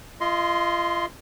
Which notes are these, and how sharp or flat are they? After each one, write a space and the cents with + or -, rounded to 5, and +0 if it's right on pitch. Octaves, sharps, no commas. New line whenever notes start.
F4 -30 D#5 +10 C6 +0